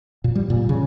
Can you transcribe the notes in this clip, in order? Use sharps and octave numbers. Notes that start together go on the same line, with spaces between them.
A#2
G3
A#2
C#3